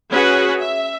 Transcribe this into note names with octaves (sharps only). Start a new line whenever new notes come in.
C#4 F#4 G#4 B4 F#5
E5